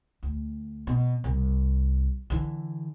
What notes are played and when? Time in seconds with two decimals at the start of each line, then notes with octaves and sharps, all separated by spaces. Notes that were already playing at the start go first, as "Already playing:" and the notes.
0.23 D2
0.87 B2
1.24 C2
2.30 D3 E3